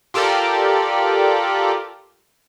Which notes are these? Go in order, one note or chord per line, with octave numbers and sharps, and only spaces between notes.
F4 G4 A4 A#4 D5